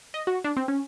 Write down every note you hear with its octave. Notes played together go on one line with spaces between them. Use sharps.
D#5
F#4
D4
C4
C#4